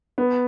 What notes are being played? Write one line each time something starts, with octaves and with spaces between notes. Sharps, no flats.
B3